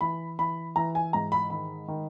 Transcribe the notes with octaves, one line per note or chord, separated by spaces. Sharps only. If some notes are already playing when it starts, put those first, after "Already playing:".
E3 B5
E3 B5
E3 A#5
G#5
G#2 A#5
B5
D#3 B5
D#3